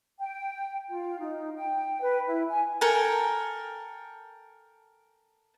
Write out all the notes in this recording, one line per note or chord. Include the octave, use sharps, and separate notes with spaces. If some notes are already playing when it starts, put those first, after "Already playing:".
G5
F4
D#4
G5
B4
E4
G#5
A4 A#4 G5 G#5